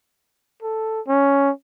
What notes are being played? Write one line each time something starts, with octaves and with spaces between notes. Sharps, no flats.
A4
C#4